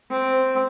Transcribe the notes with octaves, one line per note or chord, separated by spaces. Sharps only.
C4